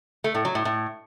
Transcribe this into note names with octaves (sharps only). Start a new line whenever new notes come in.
A3
A2
F#3
A2
A2